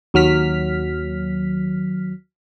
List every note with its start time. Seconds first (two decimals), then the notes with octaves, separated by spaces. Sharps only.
0.14 D#2 F#3 F6 B6